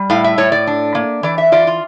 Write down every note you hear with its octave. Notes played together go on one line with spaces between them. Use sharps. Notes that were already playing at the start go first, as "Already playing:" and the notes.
Already playing: G3
A2 F5
E5
A2 C#5
D5
D4
A#3
E3 D5
E5
F4 D5
F4